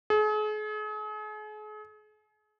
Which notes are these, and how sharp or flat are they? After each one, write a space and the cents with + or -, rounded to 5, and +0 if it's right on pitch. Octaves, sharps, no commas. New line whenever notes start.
G#4 +40